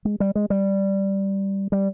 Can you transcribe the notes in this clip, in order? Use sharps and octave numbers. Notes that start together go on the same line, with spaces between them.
G#3
G3
G#3
G3
G3